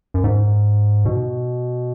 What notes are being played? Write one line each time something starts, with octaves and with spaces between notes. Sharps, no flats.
F#2
G#2
B2